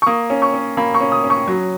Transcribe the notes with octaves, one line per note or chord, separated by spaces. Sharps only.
C#6
A#3 D#6
C#4
C#6
C#4
A#3 B5
C#6
C#4
D#6
C#4
C#6
F#3